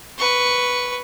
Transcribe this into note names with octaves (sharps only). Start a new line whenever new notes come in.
B4 C#6